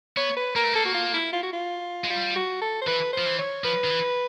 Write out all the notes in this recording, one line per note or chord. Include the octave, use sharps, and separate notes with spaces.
B3 C#5
B4
A#3 A#4
A3
A#3 A4
F#4
F4
E4
F4
F#4
F4
G#3
G3 F4
F#4
A4
C5
E3 B4
C5
F3
E3
C#5
F3 B4
D#3
E3